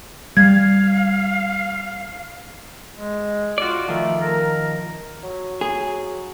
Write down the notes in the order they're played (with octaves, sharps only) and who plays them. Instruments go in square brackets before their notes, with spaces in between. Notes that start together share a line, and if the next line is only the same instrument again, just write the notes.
[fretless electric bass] G3 [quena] F5 [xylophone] G#6
[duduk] G#3
[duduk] F4 [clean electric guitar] F#4 D5
[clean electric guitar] D#3 F3 [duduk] A3
[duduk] A#4
[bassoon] F#3
[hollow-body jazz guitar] G#4